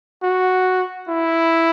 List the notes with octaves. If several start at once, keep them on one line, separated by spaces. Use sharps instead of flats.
F#4
E4